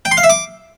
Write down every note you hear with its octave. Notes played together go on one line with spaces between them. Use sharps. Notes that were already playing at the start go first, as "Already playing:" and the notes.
G5
C6
F5
E5
D6